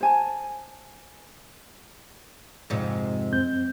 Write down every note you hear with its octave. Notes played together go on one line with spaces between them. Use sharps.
C5 G#5 A5
F2 G#2 C3
F#2 C4 G6